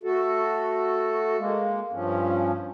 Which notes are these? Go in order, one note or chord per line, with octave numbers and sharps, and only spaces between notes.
A3 F#4 A4
G#3 A#3
G2 F3 C#4